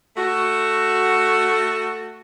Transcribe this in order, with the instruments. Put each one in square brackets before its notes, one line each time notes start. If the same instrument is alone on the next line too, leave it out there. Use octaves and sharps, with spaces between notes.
[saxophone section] A3 F#4